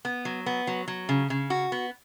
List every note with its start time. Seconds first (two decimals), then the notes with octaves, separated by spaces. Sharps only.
0.05 B3
0.25 F#3
0.46 B3
0.67 F#3
0.88 F#3
1.09 C#3
1.30 C#3
1.50 F#4
1.72 B3